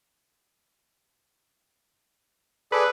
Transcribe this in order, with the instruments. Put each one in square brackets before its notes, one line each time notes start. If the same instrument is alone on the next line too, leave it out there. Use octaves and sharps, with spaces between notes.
[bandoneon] G#4 A4 D5 [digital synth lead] B4